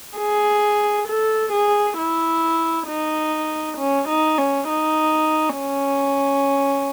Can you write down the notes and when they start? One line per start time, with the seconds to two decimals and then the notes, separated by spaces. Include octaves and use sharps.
0.18 G#4
1.08 A4
1.53 G#4
1.98 E4
2.88 D#4
3.78 C#4
4.08 D#4
4.38 C#4
4.69 D#4
5.59 C#4